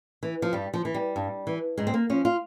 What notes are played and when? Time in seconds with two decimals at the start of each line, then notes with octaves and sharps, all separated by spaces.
0.23 E3
0.42 F3
0.53 G2 G3
0.74 F3
0.85 E3
0.94 G3
1.16 G2
1.47 E3
1.78 G#2 G#3
1.87 C4
1.94 A#3
2.10 F3 C#4
2.25 F4